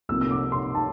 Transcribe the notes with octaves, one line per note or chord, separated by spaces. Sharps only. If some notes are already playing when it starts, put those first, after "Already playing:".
C2 C3 F3 A#3 E6
E6
D6
C6
A5